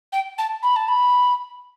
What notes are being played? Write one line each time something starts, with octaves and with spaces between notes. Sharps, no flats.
G5
A5
B5
A5
B5